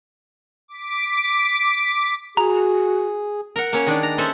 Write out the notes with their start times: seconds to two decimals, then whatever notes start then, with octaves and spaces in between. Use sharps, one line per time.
0.68 D6 B6 D7
2.37 F#4 G#4 A#5
3.56 A#4 F#5
3.73 A#3 C#4 C#5
3.87 D#3 G#3 D4 D5
4.03 A#5
4.18 G#3 C#4 A4 C5 E5 G#5